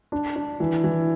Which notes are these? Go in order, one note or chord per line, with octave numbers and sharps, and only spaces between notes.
D4
D4
E3
E3